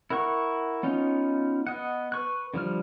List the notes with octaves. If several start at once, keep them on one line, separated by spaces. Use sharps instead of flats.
E4 A#4 F#5 C#6
B3 C#4 D#4 F4
B3 D#5 F#5
B4 C#6 F#6
D3 F3 G3 F6